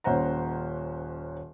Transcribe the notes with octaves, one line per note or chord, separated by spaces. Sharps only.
D#1 C#4 C5 F#5 A#5